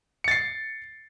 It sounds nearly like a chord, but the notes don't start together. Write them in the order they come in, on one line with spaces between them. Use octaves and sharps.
C#7 A6 C7